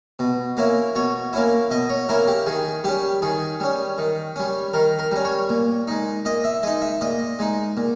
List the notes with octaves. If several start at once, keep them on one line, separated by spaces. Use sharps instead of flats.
B2
A#3 C#4 E4
B2 C#5
A#3 C#4 E4
B2 D#5
C#5
A#3 C#4 E4 A#4
G4
D#3 G#4
G3 C#4 G4
D#3 G#4
G3 C#4
D#3
G3 C#4
D#3 A#4
A#4
G3 C#4
C#5
A#2
G#3 D#4
A#2 D#5
E5
G#3 D#4 D#5
E5
A#2 D#5
G#3 D#4
A#2